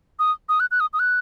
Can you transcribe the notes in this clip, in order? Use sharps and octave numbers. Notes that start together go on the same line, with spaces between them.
D#6
D#6
F#6
F#6
D#6
D#6
F#6